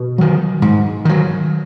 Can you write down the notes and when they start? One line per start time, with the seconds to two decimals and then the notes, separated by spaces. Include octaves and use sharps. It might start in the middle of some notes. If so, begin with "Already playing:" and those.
Already playing: B2
0.18 D#3 F#3
0.62 G#2
1.05 D#3 F#3